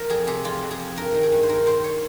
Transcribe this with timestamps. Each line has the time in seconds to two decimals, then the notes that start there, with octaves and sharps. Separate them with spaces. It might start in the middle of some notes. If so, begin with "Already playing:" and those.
Already playing: F3 A#4
0.10 F2 G#4
0.27 C3 G#4
0.44 F2 F4
0.62 F2
0.71 G#4
0.80 F3
0.96 G2 A#4
1.14 D#3
1.23 G#4
1.32 G2
1.43 C5
1.49 D#3 A#4
1.66 D#3 C5
1.84 C#5